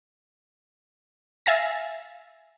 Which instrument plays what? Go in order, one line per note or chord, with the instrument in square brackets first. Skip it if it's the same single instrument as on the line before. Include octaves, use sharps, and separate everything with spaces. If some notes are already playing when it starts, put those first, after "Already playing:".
[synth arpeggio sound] E5 F5 G#5 A6 A#6